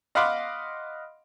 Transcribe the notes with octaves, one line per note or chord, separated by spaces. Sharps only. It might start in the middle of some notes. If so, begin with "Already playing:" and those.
D#5 F5 F#5 B5 C6 D6